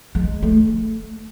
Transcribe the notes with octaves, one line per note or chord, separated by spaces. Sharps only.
G#3
A3